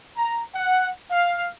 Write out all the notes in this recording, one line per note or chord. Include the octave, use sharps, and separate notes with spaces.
A#5
F#5
F5